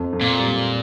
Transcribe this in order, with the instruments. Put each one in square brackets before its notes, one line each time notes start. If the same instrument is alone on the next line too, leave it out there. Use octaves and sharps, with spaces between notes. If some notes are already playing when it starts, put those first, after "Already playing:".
Already playing: [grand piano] F2
F2
[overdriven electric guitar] A#2
[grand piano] G3